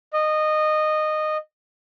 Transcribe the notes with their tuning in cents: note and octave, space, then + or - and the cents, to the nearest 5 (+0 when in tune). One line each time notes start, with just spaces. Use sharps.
D#5 -15